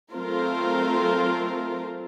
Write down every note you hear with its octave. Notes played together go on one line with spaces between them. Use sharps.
F#3 A3 C4 F4 A#4 C5